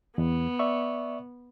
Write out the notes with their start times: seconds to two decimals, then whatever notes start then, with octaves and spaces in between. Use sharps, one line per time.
0.18 E2 B3
0.59 D5 E5 C#6